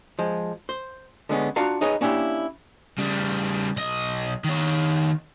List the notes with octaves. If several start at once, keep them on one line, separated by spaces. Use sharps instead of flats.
F3 G#3
C5
D3 G#3 B3 C#4
D4 F4 F#4 F5 A#5
D#4 G#4 B4 C#5 D#5
A#3 C#4 D4 E4 G4
C#3 G3
B1 D#5
D#3 C#5